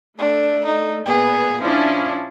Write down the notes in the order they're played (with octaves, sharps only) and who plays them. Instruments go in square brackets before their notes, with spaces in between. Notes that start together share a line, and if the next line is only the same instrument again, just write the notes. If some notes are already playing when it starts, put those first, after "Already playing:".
[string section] A3 [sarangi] D4
[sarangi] D#4
[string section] A#2 B3 [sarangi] G#4
[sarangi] F3 [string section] C#4 D4 E4